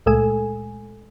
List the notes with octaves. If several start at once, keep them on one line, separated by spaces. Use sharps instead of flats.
C#2 A#2 G#3 A3 A4 G#5